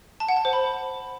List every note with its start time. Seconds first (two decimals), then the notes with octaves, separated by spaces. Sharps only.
0.20 A5
0.29 F#5
0.37 A5
0.45 C5
0.53 B5